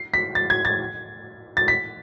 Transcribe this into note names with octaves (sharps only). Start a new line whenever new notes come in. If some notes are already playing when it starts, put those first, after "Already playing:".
Already playing: C7
B6
A6
G#6
A6
A6
B6